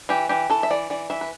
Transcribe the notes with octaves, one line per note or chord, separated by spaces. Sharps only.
E3 G4
E3 G4
E3 A4
E5
E3 D5
E3 D5
E3 E5
B4